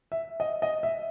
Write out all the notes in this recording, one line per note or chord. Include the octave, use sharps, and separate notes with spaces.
E5
D#5
D#5
E5